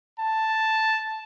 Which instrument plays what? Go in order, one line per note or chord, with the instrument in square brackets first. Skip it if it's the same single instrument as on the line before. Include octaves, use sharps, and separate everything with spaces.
[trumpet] A5